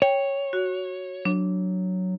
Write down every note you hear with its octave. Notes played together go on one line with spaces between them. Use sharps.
C#5 G5
F#4
F#3 D4